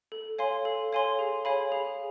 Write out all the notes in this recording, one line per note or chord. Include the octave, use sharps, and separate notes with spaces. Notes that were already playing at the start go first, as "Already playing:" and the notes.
A4
C#5 F5 G#5 C6
A4
C#5 F5 G#5 C6
G#4
C#5 F5 G#5 B5
G#4